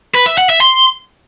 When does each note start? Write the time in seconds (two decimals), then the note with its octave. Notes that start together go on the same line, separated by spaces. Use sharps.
0.14 B4
0.26 E5
0.38 F#5
0.49 E5
0.61 C6